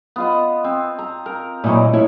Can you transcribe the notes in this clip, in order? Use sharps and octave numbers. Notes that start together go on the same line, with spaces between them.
B3 F4 D#5
C4
A#5
A#4
A#2 E3 F#3 D#4 C#6
A2 E4 C#5